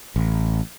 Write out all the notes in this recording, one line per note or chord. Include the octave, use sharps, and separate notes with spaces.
A1